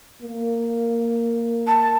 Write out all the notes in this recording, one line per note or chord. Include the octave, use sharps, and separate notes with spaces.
A#3
A5